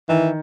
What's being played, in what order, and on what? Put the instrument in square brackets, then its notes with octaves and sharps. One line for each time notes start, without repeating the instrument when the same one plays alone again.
[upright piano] D#3 [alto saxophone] E3